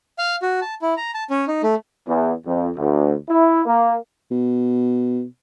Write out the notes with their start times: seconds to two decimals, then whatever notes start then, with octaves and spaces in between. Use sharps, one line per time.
0.18 F5
0.42 F#4
0.62 A5
0.82 E4
0.97 A#5
1.14 A5
1.30 C#4
1.48 D#4
1.63 A3
2.06 E2
2.46 F2
2.76 D2
3.28 E4
3.65 A#3
4.31 B2